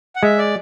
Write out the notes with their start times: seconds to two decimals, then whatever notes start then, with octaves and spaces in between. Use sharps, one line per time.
0.16 F#5
0.23 G#3 E5
0.38 D5